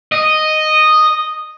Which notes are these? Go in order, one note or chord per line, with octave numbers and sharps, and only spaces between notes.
D#5